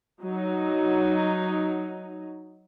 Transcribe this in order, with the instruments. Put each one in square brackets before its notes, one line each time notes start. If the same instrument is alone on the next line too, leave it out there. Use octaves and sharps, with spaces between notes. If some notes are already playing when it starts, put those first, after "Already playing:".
[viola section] F#3 D#4